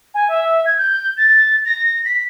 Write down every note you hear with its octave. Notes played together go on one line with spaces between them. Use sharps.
G#5
E5
G#6
G6
A6
A#6
B6